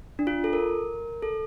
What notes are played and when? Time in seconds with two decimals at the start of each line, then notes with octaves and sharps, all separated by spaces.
0.19 D4
0.27 F4
0.44 A4
0.53 A#4
1.22 A4